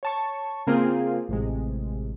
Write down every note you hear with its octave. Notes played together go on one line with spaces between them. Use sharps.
C#5 A5 C#6
C#3 A#3 C4 F4 G#4
A1 C3 G#3